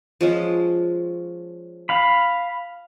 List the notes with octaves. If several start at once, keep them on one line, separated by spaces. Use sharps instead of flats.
F3 G#3 C#4
F5 B5